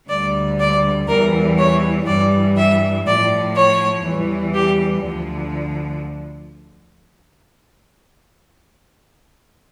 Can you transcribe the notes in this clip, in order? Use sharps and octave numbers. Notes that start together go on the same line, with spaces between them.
D2 D3 G3 D5
D5
E2 E3 G3 A#4
C#5
G2 E3 G3 D5
E5
A2 F3 D5
C#5
E2 E3 G3
G4
D2 D3 F3